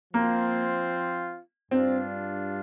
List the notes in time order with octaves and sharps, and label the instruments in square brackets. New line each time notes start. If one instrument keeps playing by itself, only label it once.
[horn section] F3 C4 F4 [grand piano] A#3
[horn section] G2 G3 D4 F4 [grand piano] C4